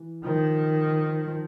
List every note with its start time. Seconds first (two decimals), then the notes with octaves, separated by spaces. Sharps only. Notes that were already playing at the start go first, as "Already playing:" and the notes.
Already playing: E3
0.25 D#3 F3
1.26 F3